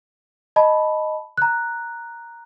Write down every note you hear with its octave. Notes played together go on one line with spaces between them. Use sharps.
D#5 A5 B5
A#5 F#6